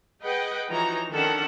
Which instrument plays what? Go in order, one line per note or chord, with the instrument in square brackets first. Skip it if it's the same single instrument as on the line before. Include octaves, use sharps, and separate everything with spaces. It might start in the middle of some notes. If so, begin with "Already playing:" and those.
[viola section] G#4 B4 D#5 F#5 G5
E3 F3 D#4 F#4 C#5 A#5
D#3 C#4 D4 A4 F#5